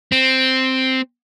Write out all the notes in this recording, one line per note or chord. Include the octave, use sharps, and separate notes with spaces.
C4